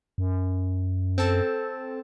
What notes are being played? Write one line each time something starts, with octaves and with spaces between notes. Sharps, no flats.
F#2
C4 A4 A5